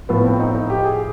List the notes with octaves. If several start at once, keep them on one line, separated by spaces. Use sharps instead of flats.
A2 F3 B3
C4
D#4
D#4
G4
G#4